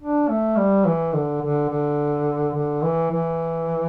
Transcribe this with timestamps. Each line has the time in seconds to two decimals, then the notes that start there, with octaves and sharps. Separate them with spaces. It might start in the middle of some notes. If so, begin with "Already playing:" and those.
0.01 D4
0.29 A3
0.57 G3
0.85 E3
1.13 D3
1.42 D3
1.69 D3
2.54 D3
2.82 E3
3.10 E3